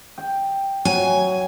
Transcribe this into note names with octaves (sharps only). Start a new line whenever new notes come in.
G5
F#3 G#5